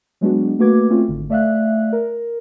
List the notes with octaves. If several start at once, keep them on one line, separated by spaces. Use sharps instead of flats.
F#3 G#3 B3 D4 F#4
A3 A#3 F#4 B4 D6 G#6
A3 C4 C#4 F4
G#1 D3
A3 D5 E5 F5 F#6
A#4